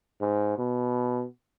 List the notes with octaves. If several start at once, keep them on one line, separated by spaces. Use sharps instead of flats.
G#2
B2